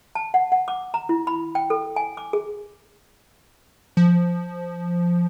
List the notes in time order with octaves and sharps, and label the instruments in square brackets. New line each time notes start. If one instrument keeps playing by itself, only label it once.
[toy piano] A5
F#5
F#5
D6
A#5
E4
B5
G5
A4
G#5
D6
G#4
[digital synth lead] F3